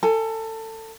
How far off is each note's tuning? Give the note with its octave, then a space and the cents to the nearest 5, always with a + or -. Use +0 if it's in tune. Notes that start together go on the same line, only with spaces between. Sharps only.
A4 +25 G#5 +10